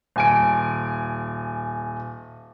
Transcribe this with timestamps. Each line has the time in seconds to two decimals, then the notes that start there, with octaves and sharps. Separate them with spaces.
0.16 D#1 G#5 D7